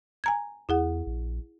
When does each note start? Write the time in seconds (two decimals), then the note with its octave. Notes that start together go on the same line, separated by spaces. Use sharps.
0.24 G#5 A#5 G#6
0.69 E2 E4 G#4 F#5
1.07 A#1